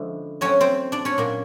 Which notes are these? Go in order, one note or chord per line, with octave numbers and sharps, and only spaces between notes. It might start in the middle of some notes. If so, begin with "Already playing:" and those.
Already playing: D3 F3 G#3 C#4 E4
F#3 A3 C4 C#4 C#5
C4 C5
D4 D5
C#4 C#5
A#2 F#3 A#3